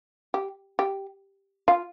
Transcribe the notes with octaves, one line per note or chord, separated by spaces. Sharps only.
G4
G4
F4